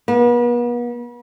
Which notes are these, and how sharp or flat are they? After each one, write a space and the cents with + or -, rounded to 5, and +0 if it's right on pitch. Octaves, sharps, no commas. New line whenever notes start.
B3 -40